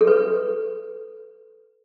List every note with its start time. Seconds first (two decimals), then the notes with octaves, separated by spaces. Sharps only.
0.01 A4
0.07 B4